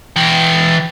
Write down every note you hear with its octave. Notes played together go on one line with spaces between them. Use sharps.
E3 G5